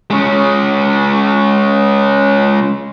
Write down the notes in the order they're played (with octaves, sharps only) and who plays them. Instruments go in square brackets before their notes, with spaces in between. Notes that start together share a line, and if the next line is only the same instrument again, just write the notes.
[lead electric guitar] G#3 C#4